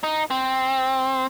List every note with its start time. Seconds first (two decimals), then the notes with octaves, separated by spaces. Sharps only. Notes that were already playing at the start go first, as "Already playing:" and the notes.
0.03 D#4
0.31 C4